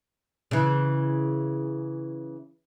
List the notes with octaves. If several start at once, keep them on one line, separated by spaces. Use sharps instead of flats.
C#3 E3